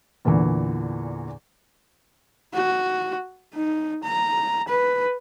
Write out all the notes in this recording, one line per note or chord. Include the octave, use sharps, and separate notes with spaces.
E2 A#2 D3 E3
F#4
D#4
A#5
B4